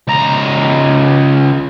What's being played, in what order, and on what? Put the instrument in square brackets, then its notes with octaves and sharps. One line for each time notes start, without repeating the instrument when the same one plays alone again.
[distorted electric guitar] C#2 A#5